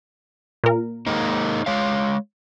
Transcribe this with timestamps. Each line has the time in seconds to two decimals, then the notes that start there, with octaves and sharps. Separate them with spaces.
0.64 A#2 A#4
1.07 G#3 A#3 D#4
1.66 G#3 C#5 F5